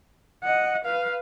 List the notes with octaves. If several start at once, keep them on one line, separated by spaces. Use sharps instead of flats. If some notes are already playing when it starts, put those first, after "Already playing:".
D#5 F#5
B4 F5